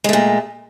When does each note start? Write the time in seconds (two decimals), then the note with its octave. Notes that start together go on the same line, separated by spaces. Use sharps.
0.04 G#3
0.09 A3
0.13 A#2